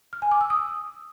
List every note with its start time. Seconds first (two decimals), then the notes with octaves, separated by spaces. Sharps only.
0.13 F6
0.22 G#5
0.31 D6
0.41 E6
0.50 D#6